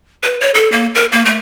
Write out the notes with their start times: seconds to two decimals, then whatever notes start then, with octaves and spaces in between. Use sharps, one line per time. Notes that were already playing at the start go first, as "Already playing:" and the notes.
0.24 B4
0.41 C#5
0.54 A4
0.72 A#3
0.95 A#4
1.12 A#3
1.25 A3